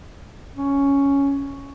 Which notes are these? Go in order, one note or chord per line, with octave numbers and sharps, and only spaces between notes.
C#4